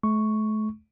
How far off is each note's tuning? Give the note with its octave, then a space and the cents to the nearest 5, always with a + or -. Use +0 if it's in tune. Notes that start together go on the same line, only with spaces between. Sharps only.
A3 -40 C#6 +0